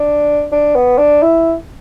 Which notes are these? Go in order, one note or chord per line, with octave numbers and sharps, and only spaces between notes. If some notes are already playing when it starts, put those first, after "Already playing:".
Already playing: D4
D4
B3
D4
E4